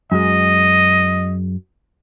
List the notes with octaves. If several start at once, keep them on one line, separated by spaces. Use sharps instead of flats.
F#2 G#3 D#5